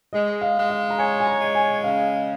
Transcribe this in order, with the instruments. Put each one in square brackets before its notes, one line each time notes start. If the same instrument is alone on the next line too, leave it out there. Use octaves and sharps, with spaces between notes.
[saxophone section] G#3 [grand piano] D#5
[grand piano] F5
[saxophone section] G#3
[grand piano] F5
A#5
[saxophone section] C#5 [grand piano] G#5
[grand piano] G#5
A#5
[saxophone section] G#3
[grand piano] G#5
[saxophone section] C#3 [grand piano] F5